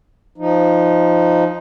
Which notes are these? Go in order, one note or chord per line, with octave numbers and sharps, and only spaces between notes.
F3 D#4